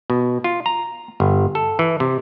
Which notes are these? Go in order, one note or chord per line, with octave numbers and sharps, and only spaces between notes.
B2
F4
A#5
G1
A4
E3
C3